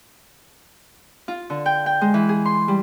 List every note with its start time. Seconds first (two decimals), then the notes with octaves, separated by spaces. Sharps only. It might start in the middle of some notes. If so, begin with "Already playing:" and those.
1.28 F4
1.50 D3
1.66 G5
1.86 G5
2.01 G#3
2.14 E3
2.29 G#4
2.45 C6
2.68 G3